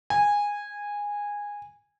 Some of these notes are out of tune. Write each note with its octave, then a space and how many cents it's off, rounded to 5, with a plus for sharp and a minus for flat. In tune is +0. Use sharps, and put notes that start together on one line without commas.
G#5 -15